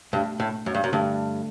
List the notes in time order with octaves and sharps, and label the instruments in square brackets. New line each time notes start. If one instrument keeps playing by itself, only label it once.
[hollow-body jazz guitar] G2 [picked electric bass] B2 A3 D4
[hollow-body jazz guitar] A2
F#2
G2
F#2
[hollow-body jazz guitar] G2 [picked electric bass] D3 A3 D4